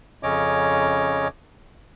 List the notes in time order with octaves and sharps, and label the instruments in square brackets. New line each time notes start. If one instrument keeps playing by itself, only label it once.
[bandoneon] F2 C#3 C#4 C#5 D#5 D6